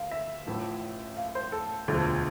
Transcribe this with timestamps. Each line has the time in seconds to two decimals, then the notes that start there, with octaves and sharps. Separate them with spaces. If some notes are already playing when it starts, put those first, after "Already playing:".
Already playing: D2 F5
0.11 E5
0.46 A1 A2 F3 A3
1.17 F5
1.35 C5
1.52 A4
1.88 E1 D2 D3 F3